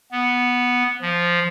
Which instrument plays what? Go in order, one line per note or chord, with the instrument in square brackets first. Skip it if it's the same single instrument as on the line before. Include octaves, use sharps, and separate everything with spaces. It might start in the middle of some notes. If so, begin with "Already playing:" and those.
[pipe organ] B3
F3